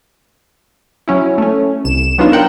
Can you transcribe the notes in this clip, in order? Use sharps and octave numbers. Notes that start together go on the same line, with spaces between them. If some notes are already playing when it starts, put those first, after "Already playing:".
F#3 C#4 E4
A3 C#4
C2 E7
F#3 B3 D4 D#4 F4
A#4 F#5 G5